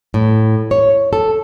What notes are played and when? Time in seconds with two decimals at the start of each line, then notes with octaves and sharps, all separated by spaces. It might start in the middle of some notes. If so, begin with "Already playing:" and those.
0.14 A2
0.71 C#5
1.13 A4